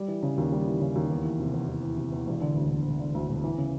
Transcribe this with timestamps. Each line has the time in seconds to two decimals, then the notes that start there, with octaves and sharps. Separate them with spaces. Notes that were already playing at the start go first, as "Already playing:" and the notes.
Already playing: G3
0.08 E3
0.23 C#3
0.38 D#2
0.52 G3
0.66 E3
0.81 C#3
0.95 D#2
1.10 E2
1.25 E3
1.40 C3
1.53 E2
1.68 E2
1.83 E3
1.97 C3
2.12 E2
2.27 E1
2.41 D3
2.56 D2
2.71 E1
2.85 E1
2.99 D3
3.15 D2
3.29 E1
3.44 E3
3.58 C#3